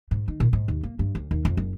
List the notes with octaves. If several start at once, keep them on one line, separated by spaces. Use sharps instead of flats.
G#2
D#3
A#2
G#2
D#2
A#3
G2
D2
D#2
F2
F#1